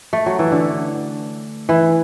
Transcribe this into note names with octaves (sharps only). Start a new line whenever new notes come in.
A3
F#3
E3
D3
E3